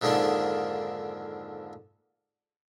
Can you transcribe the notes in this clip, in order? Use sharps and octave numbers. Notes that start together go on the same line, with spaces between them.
F2 G#2 D3 D#3 A#3 D4